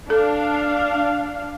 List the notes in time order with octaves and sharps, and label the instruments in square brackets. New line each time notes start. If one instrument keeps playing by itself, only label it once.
[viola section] D4 F5 [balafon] A4